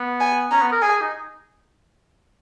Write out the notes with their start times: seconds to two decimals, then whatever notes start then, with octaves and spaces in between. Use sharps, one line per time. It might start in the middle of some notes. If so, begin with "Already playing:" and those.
Already playing: B3
0.20 G#5
0.51 C#4 A#5
0.62 B3
0.72 A#4
0.82 G#4 G#5
1.02 D#4